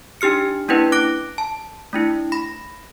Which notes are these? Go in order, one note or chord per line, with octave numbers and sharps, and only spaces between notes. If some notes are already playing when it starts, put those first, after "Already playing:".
D4 D#4 G4 F6 C#7
A#3 C#4 D4 E4 B4
D6 F#6 A#6 D7
A5
A3 D4 E4
B5 A#6